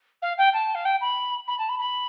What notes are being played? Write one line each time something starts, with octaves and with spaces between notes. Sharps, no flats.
F5
G5
A5
F5
G5
B5
B5
A5
B5
B5